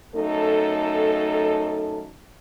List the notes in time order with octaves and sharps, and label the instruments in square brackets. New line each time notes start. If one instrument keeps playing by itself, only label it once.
[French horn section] F#2 A3 D#4 A4